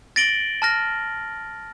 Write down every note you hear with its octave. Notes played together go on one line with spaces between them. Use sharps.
A6 A#6 D7 F#7 G7
A5 F6 A#6